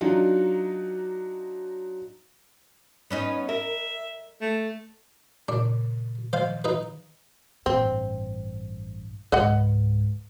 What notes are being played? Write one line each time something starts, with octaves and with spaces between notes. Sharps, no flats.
F#3 D4 D#4 F4 F#4
B3 C#4 D#4
A#4 E5
A3
A#2 C#3 D4
D#3 F3 C5 F5
D#4 B4
A1 G2 C4
C#2 G#2 B4 D#5 F#5